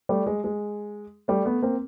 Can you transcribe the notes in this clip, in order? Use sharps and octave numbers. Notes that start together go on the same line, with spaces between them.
G3 A3
G#3
G#3
G3 A3
A3 B3
A#3 C4